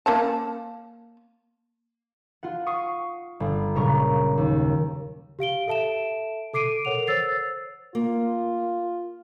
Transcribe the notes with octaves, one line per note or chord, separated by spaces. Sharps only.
A#3 C#4 A5
F4 F#5
C#6 D#6 C7
G1
F#1 A#2 C#3 A#4 A#5 C#6
D#2
G4 F5 D7 G7
A4 E5 A5 D7 E7
A4 D6 C7 D7 D#7
A4 A#4 C#5 F#5 F7
C5 C#5 E6 A6 C7
A#3 F4